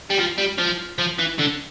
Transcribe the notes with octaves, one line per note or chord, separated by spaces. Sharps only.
G3
F3
G3
F3
F3
E3
D3